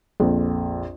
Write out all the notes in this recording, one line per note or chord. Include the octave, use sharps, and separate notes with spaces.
A#1 F2